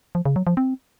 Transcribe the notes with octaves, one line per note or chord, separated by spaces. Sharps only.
F3
C#3
F#3
F3
C4